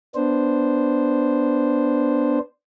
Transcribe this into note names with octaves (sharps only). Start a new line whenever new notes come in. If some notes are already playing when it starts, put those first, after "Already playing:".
B3 D4 C5